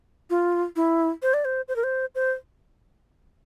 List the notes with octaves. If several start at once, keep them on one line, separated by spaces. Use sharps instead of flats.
F4
E4
C5
D5
C5
C5
A#4
C5
C5